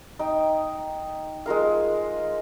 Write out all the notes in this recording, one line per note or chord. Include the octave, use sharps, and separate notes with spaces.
D#4 G5
G#3 F4 A#4 F5